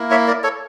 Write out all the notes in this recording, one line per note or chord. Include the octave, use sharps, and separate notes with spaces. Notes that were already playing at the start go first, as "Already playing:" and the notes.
Already playing: A#3 E4
C#5 E5
A#4 D5
A4 C#5